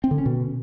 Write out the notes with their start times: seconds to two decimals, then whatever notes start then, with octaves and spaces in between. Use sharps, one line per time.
0.04 C4
0.11 D3
0.18 C#4
0.25 B2